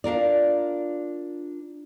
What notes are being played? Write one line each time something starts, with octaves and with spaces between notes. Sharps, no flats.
D4 F4 A#4 D5